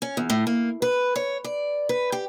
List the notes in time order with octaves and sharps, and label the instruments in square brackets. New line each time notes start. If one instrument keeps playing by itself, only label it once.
[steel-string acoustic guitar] C#4
E2
A2
A#3
B4
C#5
D5
B4
G4